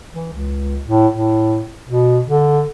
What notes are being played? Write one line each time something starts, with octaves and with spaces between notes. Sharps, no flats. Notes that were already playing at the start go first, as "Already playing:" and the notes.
E3
C#2
A2
A2
B2
D3